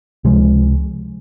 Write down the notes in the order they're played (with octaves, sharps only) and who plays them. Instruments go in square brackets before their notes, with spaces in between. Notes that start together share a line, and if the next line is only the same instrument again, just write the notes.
[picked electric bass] C#2 C3 F3 G#3